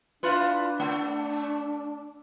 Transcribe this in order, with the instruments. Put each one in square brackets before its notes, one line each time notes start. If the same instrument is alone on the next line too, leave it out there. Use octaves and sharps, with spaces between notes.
[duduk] D4 [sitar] E4 F4 B4
[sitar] A3